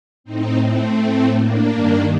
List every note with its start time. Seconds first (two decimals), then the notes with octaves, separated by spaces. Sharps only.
0.24 A2 C4 D#4
0.62 A3 C4
0.98 A2
1.34 A#3 D4
1.71 G2 D#3